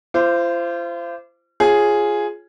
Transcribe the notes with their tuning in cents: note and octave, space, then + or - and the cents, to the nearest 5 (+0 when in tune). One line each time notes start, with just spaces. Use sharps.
F4 -40 C5 -10 D6 +0
F4 +0 G#4 +0 C#5 -20